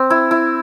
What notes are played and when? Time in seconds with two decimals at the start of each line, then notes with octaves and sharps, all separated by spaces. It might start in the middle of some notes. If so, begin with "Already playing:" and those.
Already playing: C4
0.10 E4
0.31 E4